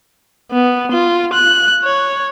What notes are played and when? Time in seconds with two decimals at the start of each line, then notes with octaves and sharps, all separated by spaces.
0.52 B3
0.92 F4
1.33 F#6
1.84 C#5